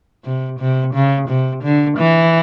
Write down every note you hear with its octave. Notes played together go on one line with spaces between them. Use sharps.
C3
C3
C#3
C3
D3
E3